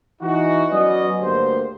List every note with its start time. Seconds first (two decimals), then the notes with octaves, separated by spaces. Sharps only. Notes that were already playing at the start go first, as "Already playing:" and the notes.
0.21 E3 D#4 F#4
0.71 F#3 B3 C#4 F#4 D5 D#5
1.20 D2 G2 D3 A#3 G4 C5